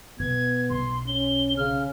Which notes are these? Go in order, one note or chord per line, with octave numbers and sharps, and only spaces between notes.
B2 B3 G#6
B1 C6
C#4 G7
C#3 F6